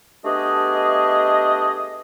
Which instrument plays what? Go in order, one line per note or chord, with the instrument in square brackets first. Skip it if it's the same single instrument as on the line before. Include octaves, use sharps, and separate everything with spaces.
[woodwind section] A3 B3 D4 G4 G#4 D#5